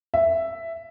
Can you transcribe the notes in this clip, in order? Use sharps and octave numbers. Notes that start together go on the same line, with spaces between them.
E5